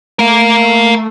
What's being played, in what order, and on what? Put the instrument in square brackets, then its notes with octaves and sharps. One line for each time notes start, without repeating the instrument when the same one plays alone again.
[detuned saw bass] A3 [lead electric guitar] A#4 F5